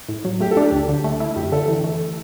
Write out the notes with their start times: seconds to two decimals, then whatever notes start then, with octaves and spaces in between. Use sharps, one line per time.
0.09 A2
0.25 F#3
0.40 A3 G4
0.51 A4
0.57 D4 G4
0.72 D2
0.89 D3
1.04 A3
1.20 E4
1.36 F#2 G4
1.52 D3 A4
1.68 E3
1.84 A3